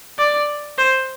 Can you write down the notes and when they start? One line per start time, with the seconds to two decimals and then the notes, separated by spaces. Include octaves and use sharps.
0.19 D5
0.78 C5